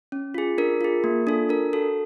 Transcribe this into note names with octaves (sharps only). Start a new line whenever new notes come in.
C#4
F4 G#4
D4 A#4
F4 G#4
A#3
D4 F4 A4
D4 A#4
F#4 A4